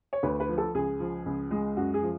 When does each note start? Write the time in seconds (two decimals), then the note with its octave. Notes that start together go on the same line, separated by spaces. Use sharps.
0.13 C#5
0.23 D2 B4
0.40 B4
0.49 F3
0.58 A4
0.75 C#2 G#4
1.00 F3
1.26 C#2
1.51 G#3
1.77 F#2 F#4
1.94 G#4
2.02 F3